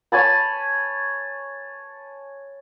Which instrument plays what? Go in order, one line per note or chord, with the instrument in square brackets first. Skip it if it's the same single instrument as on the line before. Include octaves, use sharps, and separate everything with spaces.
[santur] C#5 G#5 A5 B5